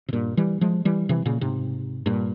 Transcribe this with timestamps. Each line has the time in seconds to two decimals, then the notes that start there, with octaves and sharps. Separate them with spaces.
0.09 C3
0.13 G2 A#2
0.37 E3 G3
0.61 F3 G#3
0.85 E3 G3
1.09 C3 E3
1.26 A#2 C#3
1.41 G#2 C3
2.06 G2 A#2